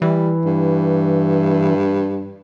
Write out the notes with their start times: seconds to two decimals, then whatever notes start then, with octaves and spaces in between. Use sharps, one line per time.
0.02 E3 G3
0.45 G2